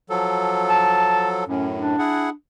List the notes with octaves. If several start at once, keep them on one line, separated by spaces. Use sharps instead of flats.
F3 F#3 A4
A5
F#2 A2 C#4
D4
E4 G#4 F#5